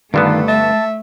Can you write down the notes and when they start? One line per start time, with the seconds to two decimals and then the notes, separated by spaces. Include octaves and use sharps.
0.14 G2 D3 D#3 A3 B3 F4 A4
0.48 E5 A5